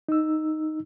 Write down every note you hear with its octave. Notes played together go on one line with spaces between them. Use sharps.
D#4 E6